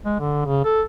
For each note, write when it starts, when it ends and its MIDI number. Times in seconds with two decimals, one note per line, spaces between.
0.05 0.14 56
0.19 0.44 50
0.45 0.63 49
0.64 0.82 69